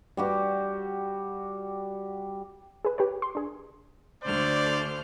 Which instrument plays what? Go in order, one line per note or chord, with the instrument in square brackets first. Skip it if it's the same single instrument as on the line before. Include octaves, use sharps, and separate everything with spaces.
[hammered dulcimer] G3 F#4 G4
[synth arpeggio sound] G#4 B4
G4 B4 C#5
C6
D4 G#4
[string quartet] D2 D3 F6 [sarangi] C5 [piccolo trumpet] D5